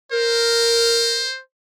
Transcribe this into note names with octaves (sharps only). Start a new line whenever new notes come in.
A#4 C5